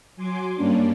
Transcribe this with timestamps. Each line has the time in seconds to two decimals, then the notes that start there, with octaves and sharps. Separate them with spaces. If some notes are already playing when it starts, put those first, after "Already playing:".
0.16 F#3 G#5 C6 D6
0.55 G2 G3 A#3 C#4 D4